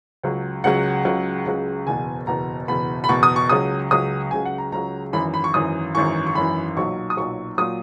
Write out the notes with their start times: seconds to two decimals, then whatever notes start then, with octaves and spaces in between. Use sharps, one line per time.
0.23 C#2 C#3 F#3
0.64 C#2 C#3 F#3 F#5
1.05 C#2 C#3 F#3
1.46 C#2 C#3 F#3
1.86 F#1 E2 B2 G#5
2.27 F#1 E2 B2 A#5
2.68 F#1 E2 B2 B5
3.04 B5
3.09 F#1 E2 B2 C#6
3.23 D#6
3.36 C#6
3.49 C#2 C#3 F#3 D#6
3.91 C#2 C#3 F#3 D#6
4.31 C#2 C#3 F#3 G#5
4.45 F#5
4.58 A#5
4.72 C#2 C#3 F#3 A#5
5.13 G#1 F#2 E3 B5
5.34 B5
5.44 C#6
5.54 G#1 F#2 E3 D#6
5.95 G#1 F#2 E3 C#6
6.26 C#6
6.35 G#1 F#2 E3 B5
6.76 B1 A#2 F#3 C#6
7.10 D#6
7.17 B1 A#2 F#3 C#6
7.58 A#2 F#3 D#6